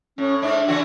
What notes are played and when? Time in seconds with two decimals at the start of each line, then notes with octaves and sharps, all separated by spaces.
0.18 A2 C#4
0.42 G#2 D4 E5
0.68 C#3 E3 F#4